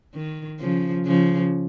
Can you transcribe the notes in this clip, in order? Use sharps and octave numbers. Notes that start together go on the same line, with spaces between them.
D#3
C#3 F3
C#3 F3